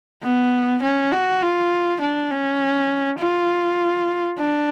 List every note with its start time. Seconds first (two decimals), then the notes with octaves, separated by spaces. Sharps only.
0.23 B3
0.82 C#4
1.12 F#4
1.42 F4
2.00 D4
2.30 C#4
3.19 F4
4.38 D4